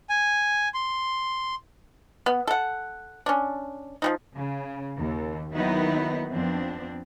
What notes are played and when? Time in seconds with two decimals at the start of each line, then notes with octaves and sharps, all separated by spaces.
0.10 G#5
0.74 C6
2.26 B3
2.47 A4 F#5
3.26 C#4 D4
4.02 F3 G3 D#4
4.35 C#3
4.97 D#2
5.54 D#3 F#3 A#3 B3 D#4 E4
6.30 F2 F3 B3 C4 D4